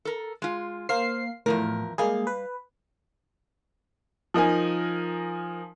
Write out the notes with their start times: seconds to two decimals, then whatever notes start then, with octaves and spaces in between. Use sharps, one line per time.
0.05 A4 A#4
0.42 G#3 F4
0.89 A#3 C5 F5 C7
1.46 E2 A2 F3 A#4
1.98 G3 G#3 A#3 G#4 F5
2.27 B4
4.34 F3 D#4 A#4 G#5